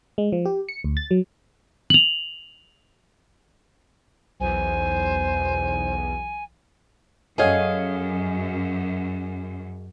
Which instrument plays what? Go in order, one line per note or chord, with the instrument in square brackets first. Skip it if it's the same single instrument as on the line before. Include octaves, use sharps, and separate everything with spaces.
[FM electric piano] G#3
F3
G4
C#7
D2
A6
F#3
[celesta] F7 F#7
[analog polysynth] B1 E2 [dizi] C5 [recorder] G#5
[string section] F#2 [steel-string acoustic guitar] G#4 D#5 F5 [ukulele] A4 C#5 F#5